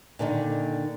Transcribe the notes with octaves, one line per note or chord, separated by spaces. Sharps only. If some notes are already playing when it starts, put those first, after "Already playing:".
A#2 D3 D#3